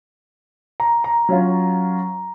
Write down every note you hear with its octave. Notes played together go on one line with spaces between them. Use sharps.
A#5
A#5
F#3 C#4 F4